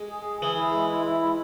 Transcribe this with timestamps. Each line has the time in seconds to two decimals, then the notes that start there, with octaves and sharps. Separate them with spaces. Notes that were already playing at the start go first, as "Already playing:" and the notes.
Already playing: G#3
0.10 G#4
0.26 G#4
0.42 E3 G#4
0.58 E4
0.74 G#3
0.90 E4
1.06 E4
1.21 G#3